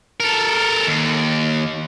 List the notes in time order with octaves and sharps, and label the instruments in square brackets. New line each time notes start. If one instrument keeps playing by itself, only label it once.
[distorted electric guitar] A4 A#4
D#2